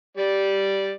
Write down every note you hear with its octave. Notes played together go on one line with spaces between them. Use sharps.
G3 D5